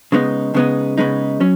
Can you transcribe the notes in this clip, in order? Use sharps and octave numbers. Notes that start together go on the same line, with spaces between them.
C#3 G#3 B3 D#4
C#3 G#3 B3 D#4
C#3 G#3 B3 D#4
F#3 C#4